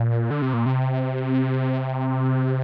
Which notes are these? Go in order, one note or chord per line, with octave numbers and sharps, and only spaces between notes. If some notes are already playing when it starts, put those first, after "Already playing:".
Already playing: A#2
D3
C3
A#2
C3